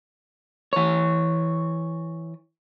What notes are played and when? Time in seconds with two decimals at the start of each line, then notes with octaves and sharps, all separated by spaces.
0.73 E3 C#5